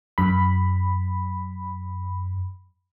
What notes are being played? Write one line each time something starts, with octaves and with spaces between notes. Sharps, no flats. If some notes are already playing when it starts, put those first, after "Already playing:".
F#2 B5